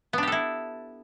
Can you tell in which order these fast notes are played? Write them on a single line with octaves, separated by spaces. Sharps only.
B3 D4 G4 A4 E4